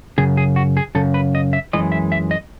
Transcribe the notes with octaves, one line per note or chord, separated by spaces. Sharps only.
F#2 C#3 G#4
G#4
F#4
G#4
F#2 C#3 A4
B4
D#5
E5
F#2 C#3 E3 G#3 D#5
E5
E5
D#5